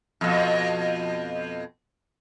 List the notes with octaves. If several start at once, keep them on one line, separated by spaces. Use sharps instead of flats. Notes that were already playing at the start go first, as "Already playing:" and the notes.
F2 B2